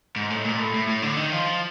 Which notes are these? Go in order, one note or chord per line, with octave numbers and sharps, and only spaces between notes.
G#2
A2
A#2
A2
A2
A2
D3
D#3
F3